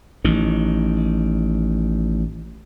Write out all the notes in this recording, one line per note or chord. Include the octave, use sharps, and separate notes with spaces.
A1 D#3